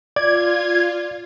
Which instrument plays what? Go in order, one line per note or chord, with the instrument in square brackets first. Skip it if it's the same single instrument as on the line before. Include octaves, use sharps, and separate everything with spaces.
[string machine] F4 [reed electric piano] D5 [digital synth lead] G#6